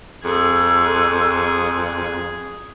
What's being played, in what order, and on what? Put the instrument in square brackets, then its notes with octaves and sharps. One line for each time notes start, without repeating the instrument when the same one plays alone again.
[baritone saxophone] F2 [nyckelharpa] G#4 [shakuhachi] A4